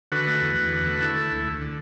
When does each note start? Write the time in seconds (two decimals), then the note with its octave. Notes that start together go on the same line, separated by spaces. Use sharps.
0.12 D3 F#4 B4
0.27 A3
0.41 E2
0.57 E2
0.72 D3
0.86 A3
1.01 D3 E4 A4
1.16 A3
1.31 D2
1.47 D2
1.62 D3